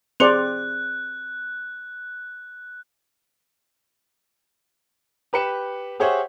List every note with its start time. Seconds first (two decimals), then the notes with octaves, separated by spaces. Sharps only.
0.20 C4 G#4 C5 D5 C6 F#6 C#7
5.33 G4 B4 G5 C#7 E7
6.00 G4 G#4 C5 C#5 E5 F#5